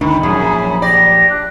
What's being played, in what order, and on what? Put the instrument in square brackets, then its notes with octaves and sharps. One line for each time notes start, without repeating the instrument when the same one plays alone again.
[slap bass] G1 D2 D4 [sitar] D#3 [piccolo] B5
[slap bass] A#1 A#2 [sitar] F#2 [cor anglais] G#4
[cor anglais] G4 [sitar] D5 [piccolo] A#6
[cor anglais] D4 [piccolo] F#6